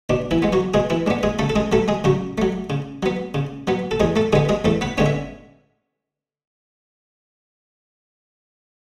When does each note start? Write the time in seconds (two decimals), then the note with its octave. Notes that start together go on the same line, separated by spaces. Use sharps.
0.10 B2 D4
0.31 E3 E4
0.42 G#3 B3
0.53 F#3 F#4
0.74 B2 G#3 G#4
0.90 E3 E4
1.07 G#3 D4
1.10 B3
1.23 G#3 G#4
1.39 C#3 A3 A4
1.50 A4
1.56 G#3 G#4
1.72 F#3 A3 A4
1.88 G#3 G#4
2.04 C#3 F#3 F#4
2.38 F#3 A3
2.70 C#3
3.03 F#3 B3
3.34 C#3
3.67 F#3 B3
3.91 A4
4.00 E2 G#3 G#4
4.16 A3 A4
4.33 D3 G#3 B3 G#4
4.49 G#3 G#4
4.65 E2 A3 A4
4.81 B3 B4
4.98 D3 G#3 B3 C#4 C#5
5.06 E5